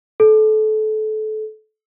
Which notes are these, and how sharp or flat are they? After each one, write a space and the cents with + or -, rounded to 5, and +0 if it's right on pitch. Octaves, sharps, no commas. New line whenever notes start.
A4 -25